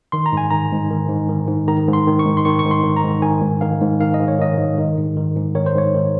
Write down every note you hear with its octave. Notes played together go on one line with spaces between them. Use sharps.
D#3 C6
A#5
G#2 G#5
D#3 A#5
G#2
D#3
G#2
D#3
G#2
D#3 A#5
G#2
C6
D#3
C#6
G#2
C6
D#3 C#6
C#6
G#2
C6
D#3
A#5
G#2
D#3 G#5
G#2
D#3 F5
G#2
D#3 F5
D#5
G#2
C#5
D#3 D#5
G#2
D#3
G#2
D#3
G#2
D#3 C#5
C5
G#2 C#5
D#3